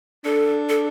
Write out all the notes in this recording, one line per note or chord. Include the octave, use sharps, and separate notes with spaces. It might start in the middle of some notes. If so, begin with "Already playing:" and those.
D4 A4
A4